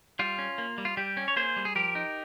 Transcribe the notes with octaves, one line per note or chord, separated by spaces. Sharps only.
G3 F4
C#4
A#3
G3
F4
G3 G4
C#4
C#5
A#3 G#4 C5
G3
G#4
F3 G4 A#4
D#4